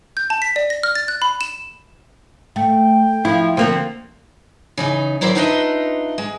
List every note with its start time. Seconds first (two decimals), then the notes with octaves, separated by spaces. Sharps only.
0.17 G6
0.30 A5
0.42 B6
0.56 D5
0.70 A#6
0.83 F6
0.95 A6
1.08 F#6
1.22 B5
1.41 E7
2.56 A3 G5
3.25 F3 E4
3.57 D3 F3 A#3 C4
4.78 C#3 E3 D#4
5.21 F#3 E4 A#4 C5 D5
5.35 D4 D#4 F4 B4 D#5 E5
6.18 G#3